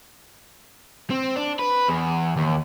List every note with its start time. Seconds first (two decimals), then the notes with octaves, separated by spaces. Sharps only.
1.10 C4
1.36 D4
1.59 B4
1.89 E2
2.37 D#2